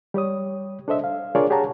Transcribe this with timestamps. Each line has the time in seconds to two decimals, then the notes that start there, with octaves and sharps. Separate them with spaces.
0.14 G3 G4 C#5 D#6
0.88 D4 A4 C5 D#5 E5
1.04 F5
1.35 D4 F4 G#4 A#4 C#5 D5
1.50 G4 G#4 C#5 F#5 A5 A#5